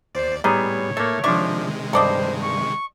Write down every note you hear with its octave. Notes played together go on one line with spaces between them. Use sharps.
D#2 C5 D5
A2 G3 B3 D#4 G#4 C#5
A3 A#3 A4
C3 D#3 F3 G#3 D4 D5 E5 C#6
G2 A4 C5 D5 D#5
C#6